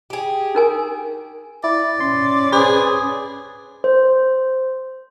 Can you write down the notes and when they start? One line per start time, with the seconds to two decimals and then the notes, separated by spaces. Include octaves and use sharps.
0.10 G4 G#4
0.55 D#4 A#4 G#5
1.64 E4 D5
2.00 C#4 C6
2.52 G#4 B4 C5 D5
3.84 C5